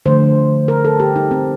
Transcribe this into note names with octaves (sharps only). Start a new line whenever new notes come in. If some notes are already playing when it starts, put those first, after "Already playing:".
D3 F3 A3 C5
A#4
A4
G4
D#4
C4